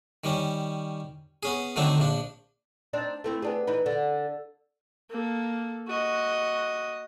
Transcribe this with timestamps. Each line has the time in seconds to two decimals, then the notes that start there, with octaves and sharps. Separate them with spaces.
0.24 D#3 G3 C#4
1.43 B3 C#4 G#4
1.76 D3 D#3 F#3 A3 C4 D4
1.98 A#1 F3 D4
2.93 C4 D4 D#4
3.24 A3 C4 E4
3.42 B3 D4 G#4
3.67 E3 D#4 B4
3.86 D3
5.10 A#3 A4
5.88 F#4 D#5